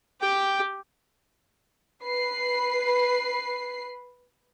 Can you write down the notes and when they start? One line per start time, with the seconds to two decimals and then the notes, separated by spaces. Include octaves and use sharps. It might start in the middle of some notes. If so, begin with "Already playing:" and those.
0.22 G4 G5
2.04 B4 C7